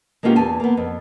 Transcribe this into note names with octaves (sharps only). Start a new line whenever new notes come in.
G#3 A#3 B3 C#4 F4 G4
E2 G#5 A5
A#3 B3
F2